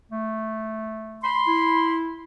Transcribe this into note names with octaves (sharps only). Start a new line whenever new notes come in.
A3
B5 C6
E4